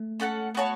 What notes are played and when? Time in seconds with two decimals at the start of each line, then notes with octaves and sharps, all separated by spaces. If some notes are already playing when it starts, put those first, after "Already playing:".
Already playing: A3
0.20 C#4 A4 F#5 A5
0.55 B3 F#4 C#5 A5